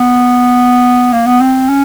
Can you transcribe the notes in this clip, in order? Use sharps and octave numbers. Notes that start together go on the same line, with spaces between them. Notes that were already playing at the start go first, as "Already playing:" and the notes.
Already playing: B3
A#3
B3
C4
C#4